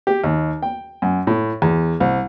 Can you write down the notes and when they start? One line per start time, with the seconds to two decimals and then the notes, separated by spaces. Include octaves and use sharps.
0.07 G4
0.24 D#2
0.62 G5
1.02 F#2
1.27 A2
1.62 E2
2.00 C2